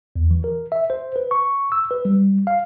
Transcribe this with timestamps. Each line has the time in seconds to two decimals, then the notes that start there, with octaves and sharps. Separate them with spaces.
0.16 E2
0.31 E3
0.44 A#4
0.72 E5
0.90 C5
1.16 B4
1.31 C#6
1.72 E6
1.91 B4
2.05 G3
2.47 F5